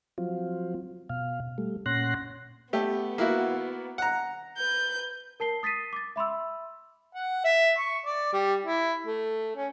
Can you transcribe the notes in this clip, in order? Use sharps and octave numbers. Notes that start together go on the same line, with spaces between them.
F3 F#3 C4 F4
B2 F5
G3 A3
A#2 C#4 F#5 C6 F#6 A#6
A3 B3 G4
A#3 E4 F#4
F#5 A#5
B4 G6
A#4 A5 C7 G7
D#6 A6 B6 C7 D#7
D6 A6
E5 B5 C6 E6
F#5
E5
C#6
D5
G3
E4
A3
C#4